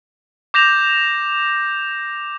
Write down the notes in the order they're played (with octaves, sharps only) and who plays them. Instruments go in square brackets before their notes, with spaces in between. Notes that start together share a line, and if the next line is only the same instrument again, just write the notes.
[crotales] D6 G6 A#6 E7 F7